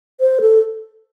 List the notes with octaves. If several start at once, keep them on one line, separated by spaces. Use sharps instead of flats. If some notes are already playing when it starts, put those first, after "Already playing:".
C5
A4